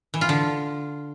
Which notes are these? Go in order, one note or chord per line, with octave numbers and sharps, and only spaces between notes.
E3
F4
D3